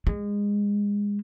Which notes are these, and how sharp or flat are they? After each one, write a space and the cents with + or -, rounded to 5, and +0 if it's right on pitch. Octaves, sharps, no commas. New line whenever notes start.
G#3 -25